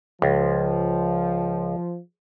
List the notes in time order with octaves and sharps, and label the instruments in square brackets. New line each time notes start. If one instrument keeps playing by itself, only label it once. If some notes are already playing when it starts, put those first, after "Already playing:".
[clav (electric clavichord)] C#2 [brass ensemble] F3